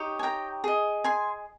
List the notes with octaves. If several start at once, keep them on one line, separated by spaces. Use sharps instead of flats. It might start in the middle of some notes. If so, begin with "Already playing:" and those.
Already playing: D#4 G4 C#5
G#5
G5 A#5
G#4 D#5
G#5 C6